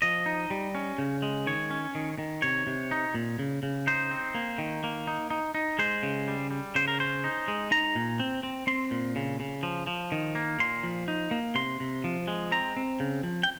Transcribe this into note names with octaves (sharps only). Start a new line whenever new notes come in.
F3 D#5
D#4
G3
C#4
C#3
G#3
D#3 C#5
C#4
D#3
D#3
C3 C#5
C3
D#4
A#2
C#3
C#3
D#4 C5
C4
A#3
D#3
A#3
D#4
D#4
D#4
G#3 C5
C#3
G3
G3
C#3 C5
A#4
C#4 C5
D#4
G#3
D#4 A#5
A#2
C4
C4
C4 C6
A#2
C#3
C#3
F3
F3
D#3
A#3
A#2 C6
F3
D#4
A#3
C3 C6
C3
F3
G#3
C4 A#5
C4
C#3
F3
G5